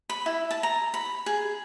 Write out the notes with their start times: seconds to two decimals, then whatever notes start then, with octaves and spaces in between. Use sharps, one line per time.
0.09 B5
0.26 E4
0.51 A5
0.63 A#5
0.94 B5
1.26 G#4